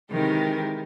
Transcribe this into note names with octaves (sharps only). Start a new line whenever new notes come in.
C3 D#3 E3 G#3 G4 A#4